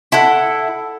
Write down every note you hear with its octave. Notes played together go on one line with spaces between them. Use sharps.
E4 A4 F#5